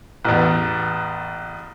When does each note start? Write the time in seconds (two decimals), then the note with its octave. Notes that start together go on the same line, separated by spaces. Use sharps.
0.24 A1 E2